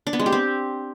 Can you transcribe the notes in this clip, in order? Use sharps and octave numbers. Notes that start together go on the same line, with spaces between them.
D4
B3
G#3
G4
C4